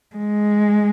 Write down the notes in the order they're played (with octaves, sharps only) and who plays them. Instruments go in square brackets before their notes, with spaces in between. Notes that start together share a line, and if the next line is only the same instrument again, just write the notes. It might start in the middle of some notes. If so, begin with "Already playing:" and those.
[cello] G#3